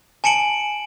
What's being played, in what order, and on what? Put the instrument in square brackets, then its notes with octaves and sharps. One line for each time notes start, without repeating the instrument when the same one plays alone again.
[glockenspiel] G#5 A5 C#7 D7 F#7